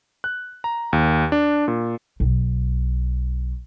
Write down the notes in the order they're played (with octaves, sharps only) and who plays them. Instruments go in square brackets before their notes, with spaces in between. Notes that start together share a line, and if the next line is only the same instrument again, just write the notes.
[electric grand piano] F#6
A#5
D#2
D4
A#2
[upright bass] B1